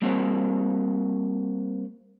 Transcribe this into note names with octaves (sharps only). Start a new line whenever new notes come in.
G3 A#3 C4 F#4 C#5